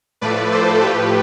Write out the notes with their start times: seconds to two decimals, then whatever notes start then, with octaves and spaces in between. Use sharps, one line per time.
0.21 A2 F3 A3 B4 D5
0.52 A4 C5
0.82 A2 F3 A3 G4 B4